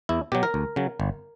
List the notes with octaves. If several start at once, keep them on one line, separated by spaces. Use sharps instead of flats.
E2 E4
B2 F#3 G4
A#4
D2
C#3 F#3
G1